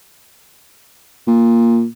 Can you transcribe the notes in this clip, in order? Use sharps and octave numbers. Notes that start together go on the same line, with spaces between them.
A#2